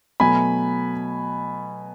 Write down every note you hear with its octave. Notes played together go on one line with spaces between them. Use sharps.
B2 F#3 A3 G#5 B5